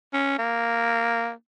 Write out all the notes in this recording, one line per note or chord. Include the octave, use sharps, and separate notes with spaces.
C#4
A#3